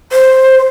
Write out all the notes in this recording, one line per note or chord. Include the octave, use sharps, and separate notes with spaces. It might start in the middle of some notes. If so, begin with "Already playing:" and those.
C5